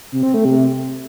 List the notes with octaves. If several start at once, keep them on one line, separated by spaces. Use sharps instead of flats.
C3
C4
A3
C3